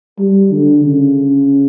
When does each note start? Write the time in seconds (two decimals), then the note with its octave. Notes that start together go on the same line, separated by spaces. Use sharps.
0.18 G3
0.52 D3
0.84 C#3